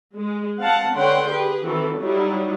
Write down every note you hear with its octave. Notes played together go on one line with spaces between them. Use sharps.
G#3
C4 F5 F#5 A5
D3 B4 C#5 F#5 G5 C6
G4 G#4 B4
D#3 E3 C4 F#4 A4
F#3 G3 D#4 E4